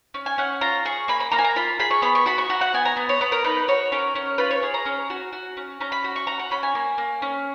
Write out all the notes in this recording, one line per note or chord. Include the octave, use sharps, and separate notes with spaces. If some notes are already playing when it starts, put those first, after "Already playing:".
C#4
G#5
C#4 F#5
F4 A#5
G#4 C#6
A#3 B5
B5
A#3 A#5
G#5
A#5
F4 B5
G#4 B5
C#6
B3 B5
C#6
F#4 B5
C#6
F#4 A#5
F#5
B3 G#5
A#5
B3
C#5
B3 B4
A#4
D#4 B4
F#4 C#5
C#4 A#4
C#4
F4 B4
C#5
G#4
A#5
C#4
F#4
F#4
C#4
C#4 A#5
B5
F#4
C#6
F#4 A#5
F#5
C#4 B5
G#5
A#3
A#3
C#4